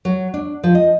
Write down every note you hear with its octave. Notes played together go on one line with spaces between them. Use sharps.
F#3
D4
F3
D#5